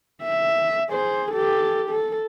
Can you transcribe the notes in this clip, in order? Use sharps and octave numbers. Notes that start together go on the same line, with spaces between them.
E5
G#4 C5
G4 A4
A4